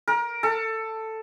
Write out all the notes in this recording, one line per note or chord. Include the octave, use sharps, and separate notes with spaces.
A#4
A4